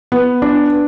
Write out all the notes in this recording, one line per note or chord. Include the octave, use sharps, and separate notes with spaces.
B3
D4